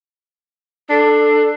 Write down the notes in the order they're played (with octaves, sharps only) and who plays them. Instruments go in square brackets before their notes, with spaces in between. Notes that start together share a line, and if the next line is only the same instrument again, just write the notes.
[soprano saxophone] D4 [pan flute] A4